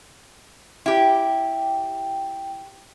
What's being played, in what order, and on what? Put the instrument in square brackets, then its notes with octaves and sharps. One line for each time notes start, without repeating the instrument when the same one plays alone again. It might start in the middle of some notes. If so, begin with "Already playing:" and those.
[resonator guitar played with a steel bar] E4 G4 [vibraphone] G5